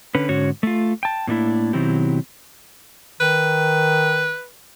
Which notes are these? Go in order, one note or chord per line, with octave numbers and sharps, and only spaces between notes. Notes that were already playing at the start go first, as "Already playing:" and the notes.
D3 C#4 B4
G#2 D3 C#4 F#4 C#5
A3 F4
G5 A5
A2 A#3 D4 E4
B2 D#3 F#3 C4 E4 G4
D#3 B4